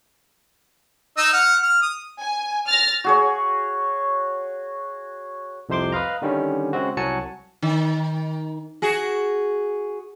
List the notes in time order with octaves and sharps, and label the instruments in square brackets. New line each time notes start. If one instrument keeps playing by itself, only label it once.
[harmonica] D#4 D#5 E6
F#5 F6
F6
D#6
[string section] G#5
F6 A6 A#6
[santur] F#4 G#4 C#5
[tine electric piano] C2 F2 C3 C5 C6 D6
B4 D#5 F5 A#5
D3 D#3 G3 C#4
C#3 G#3 C4 F#4
C2 F#3 F#4 G#5 A5 C#7
[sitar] D#3
F#4 G#4